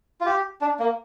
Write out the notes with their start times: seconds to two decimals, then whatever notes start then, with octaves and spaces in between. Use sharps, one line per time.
0.21 F4
0.26 G4
0.61 D4
0.79 A#3